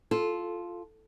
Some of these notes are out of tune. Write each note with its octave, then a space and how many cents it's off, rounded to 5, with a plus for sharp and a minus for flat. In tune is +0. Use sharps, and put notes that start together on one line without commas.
F4 +0 A4 -15